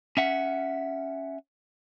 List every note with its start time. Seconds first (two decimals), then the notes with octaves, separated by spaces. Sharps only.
0.17 C#4 E5 F#5